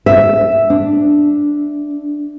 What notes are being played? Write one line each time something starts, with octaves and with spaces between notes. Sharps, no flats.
E5
D4